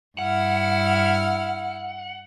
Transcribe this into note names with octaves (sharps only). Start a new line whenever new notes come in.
G2 E4 F#5 F6